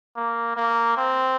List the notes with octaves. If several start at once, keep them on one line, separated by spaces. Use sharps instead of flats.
A#3
A#3
C4